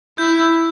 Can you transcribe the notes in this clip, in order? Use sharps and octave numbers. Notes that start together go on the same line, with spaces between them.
E4 G6